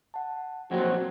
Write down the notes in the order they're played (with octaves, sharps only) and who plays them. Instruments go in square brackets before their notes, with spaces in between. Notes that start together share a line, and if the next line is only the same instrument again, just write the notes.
[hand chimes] F#5 A5
[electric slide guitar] F2 A#2 F#3 [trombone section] C4 F#4 [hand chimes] F#5 G#6 A#6